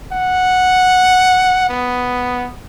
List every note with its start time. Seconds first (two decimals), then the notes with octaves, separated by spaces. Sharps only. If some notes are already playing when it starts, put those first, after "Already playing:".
0.12 F#5
1.69 B3